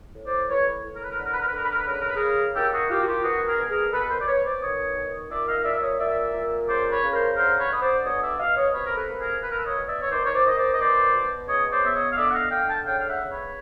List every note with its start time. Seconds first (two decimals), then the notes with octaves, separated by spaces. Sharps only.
0.15 A2
0.26 C5 D5
0.49 A2 B4 C#5
0.84 A2
0.95 A#4
1.03 B4
1.10 A#4
1.18 D3 B4
1.26 A#4
1.33 B4
1.40 A#4
1.48 B4
1.52 D3 A#4
1.63 B4
1.71 A#4
1.78 B4
1.85 C#3 A#4
1.93 B4
2.01 A#4
2.08 B4
2.15 G#4 A#4
2.21 C#3
2.55 D#3 G4 A4
2.73 F#4 G#4
2.90 D#3 F4 G4
3.02 F#4
3.07 F4 G4
3.24 B2 F#4 G#4
3.47 G#4 A#4
3.58 B2
3.70 G#4 A#4
3.93 B2 A4 B4
4.10 A#4 C5
4.20 D5
4.27 B2 B4 C#5
4.44 C5 D5
4.61 D#3 C#5 D#5
4.95 D#3
5.30 A#2 D5 E5
5.47 D#5 F5
5.64 A#2 D5 E5
5.82 C#5 D#5
5.99 A#2 D5 E5
6.33 A#2
6.67 C#3 C5 D5
6.90 B4 C#5
7.02 C#3
7.13 A#4 C5
7.36 D3 A#4 C5
7.59 B4 C#5
7.70 D3 D#5
7.82 C5 D5
8.05 B2 C#5 D#5
8.22 D5 E5
8.39 B2 D#5 F5
8.56 C#5 D#5
8.74 C3 B4 C#5
8.86 A#4
8.96 A4 B4
9.08 A#3
9.19 G#4 A#4
9.42 B2 B4
9.49 A#4
9.57 A4 B4
9.65 C#5 D#5
9.77 B2
9.88 D5 E5
10.00 C#5
10.11 D#3 C5 D5
10.25 C#5
10.34 C5 D5
10.45 D#3 D#5
10.56 C5 D5
10.73 D#5
10.80 B2 C5 D5
11.14 B2
11.48 C#3 C#5 D#5
11.71 C5 D5
11.83 B3 E5
11.94 C#5 D#5
12.12 F5
12.17 D3 D5 E5
12.30 F#5
12.34 D#5 F5
12.51 D3 F5 G5
12.68 G5 A5
12.85 C#3 F5 G5
12.99 F5
13.08 E5 F#5
13.20 C#3
13.31 B4 C#5